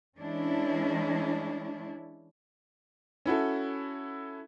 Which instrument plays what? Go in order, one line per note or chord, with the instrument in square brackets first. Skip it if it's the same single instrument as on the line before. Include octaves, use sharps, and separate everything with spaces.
[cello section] E3 G#3 C#4 D4 E4
[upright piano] C#4 E4 F#4 A4